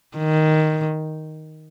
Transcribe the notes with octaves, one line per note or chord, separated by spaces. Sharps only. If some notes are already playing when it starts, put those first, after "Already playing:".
D#3